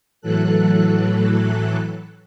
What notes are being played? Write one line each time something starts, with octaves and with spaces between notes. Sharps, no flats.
A2 E3 F#3 A4 F#6